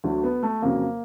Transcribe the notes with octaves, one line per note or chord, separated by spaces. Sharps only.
D2 D3 F#3
B3
A3
F2 C#3 F#3 A#3